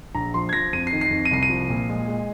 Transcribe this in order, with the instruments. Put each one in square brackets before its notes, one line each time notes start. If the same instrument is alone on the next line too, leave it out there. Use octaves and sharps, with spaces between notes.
[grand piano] A#1 A#5
F3 C6
G#6
F3 A#6
F2 D#7
C7
D#3
C7
F2
D#7
C2 C7
D#7
F3
A#2
G#3
G#3